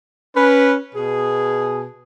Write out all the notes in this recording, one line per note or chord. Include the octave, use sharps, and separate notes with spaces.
C#4 B4
B2 G#4